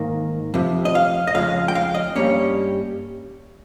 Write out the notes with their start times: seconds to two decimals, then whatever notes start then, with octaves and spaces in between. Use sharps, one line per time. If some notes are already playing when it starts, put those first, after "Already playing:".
Already playing: G#2 D#3 A#3
0.54 F2 C3
0.85 D#5
0.95 F5
1.27 D#5
1.35 F2 C#3 G#3 F5
1.68 G5
1.75 F5
1.94 D#5
2.15 G2 G3 A#3 C#4 C#5